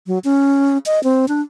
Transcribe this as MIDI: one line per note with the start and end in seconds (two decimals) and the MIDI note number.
0.07 0.19 54
0.24 0.78 61
0.86 1.02 75
1.04 1.26 60
1.28 1.41 62